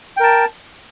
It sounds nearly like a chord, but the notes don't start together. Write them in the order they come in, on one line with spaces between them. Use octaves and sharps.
G5 A#4 A5